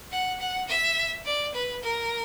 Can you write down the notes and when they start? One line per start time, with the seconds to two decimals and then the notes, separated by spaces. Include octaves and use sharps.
0.12 F#5
0.40 F#5
0.68 E5
1.26 D5
1.54 B4
1.83 A#4